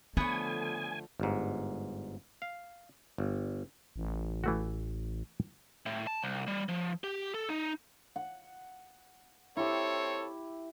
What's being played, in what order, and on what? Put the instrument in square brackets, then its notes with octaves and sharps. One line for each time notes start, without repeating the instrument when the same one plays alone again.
[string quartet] D3 F3 A3 [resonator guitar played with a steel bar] B3 C#5 [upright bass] F4 [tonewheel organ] G#5
[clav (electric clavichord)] G1 G#2
F5
G1
[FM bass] A1
[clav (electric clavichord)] E3 A3 F#4
[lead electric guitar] A2
A5
C2
G3
F3
G4
A4
D#4
[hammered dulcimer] F#5
[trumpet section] C4 A4 C#5 [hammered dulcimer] E4 G4